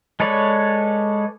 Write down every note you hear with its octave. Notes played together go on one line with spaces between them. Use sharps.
G#3 A4 B4 C#5 D5